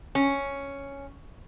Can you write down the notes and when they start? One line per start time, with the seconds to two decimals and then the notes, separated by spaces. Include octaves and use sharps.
0.15 C#4